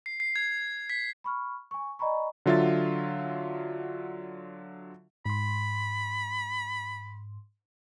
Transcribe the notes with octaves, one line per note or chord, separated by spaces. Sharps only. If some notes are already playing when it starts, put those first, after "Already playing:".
C7
C7
G#6
B6
B5 C#6 F6
G#5 C#6
D5 D#5 G#5 A#5 B5 C#6
D3 F#3 F4 E5 F5 A6
G#2 B5 C6